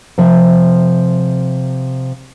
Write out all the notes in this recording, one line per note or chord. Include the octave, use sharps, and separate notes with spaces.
C3 F3 E5